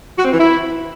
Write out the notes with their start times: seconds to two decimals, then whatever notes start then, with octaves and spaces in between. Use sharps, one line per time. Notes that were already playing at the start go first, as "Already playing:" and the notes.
0.18 F#4
0.25 C4
0.32 E3
0.40 E4